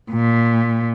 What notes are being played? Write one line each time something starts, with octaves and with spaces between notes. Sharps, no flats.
A#2